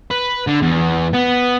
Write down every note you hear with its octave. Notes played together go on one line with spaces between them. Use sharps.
B4
D3
E2
B3